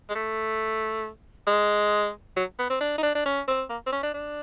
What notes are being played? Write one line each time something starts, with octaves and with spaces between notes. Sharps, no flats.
G#3
A3
G#3
F#3
B3
C4
D4
D#4
D4
D4
C#4
C4
A#3
C4
C#4
D4
D4